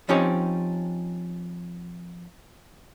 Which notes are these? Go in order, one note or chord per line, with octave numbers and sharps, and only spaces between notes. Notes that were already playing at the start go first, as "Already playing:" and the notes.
F3 C4 C#4 D#4 G4 C#5